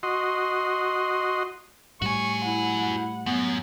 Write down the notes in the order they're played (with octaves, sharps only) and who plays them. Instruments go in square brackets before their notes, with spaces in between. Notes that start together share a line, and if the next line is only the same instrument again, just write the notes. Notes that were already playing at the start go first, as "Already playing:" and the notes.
[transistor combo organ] F#4 D#5 C6
[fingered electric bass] A2 G3 [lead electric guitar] F#4 G#5 [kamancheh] C#6
[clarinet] E4 [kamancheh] F#5
[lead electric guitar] F#2 [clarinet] B3